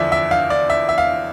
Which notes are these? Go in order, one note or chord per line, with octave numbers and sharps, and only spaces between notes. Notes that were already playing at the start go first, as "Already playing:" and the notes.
Already playing: E2 D3 F3 D5 E5
E5
F5
D5
E5
E5
F5